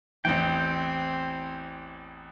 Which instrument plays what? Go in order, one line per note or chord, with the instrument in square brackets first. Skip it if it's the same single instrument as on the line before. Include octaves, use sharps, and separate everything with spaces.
[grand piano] A1 E2 E3 [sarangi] C4 [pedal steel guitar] G5